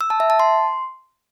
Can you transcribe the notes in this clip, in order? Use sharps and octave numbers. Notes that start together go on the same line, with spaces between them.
E6
A5
E5
A5
C6